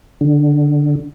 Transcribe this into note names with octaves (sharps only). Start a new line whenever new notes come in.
D3